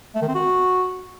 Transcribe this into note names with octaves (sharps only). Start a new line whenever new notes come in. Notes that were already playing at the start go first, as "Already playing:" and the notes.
A3
D#3
C4
F#4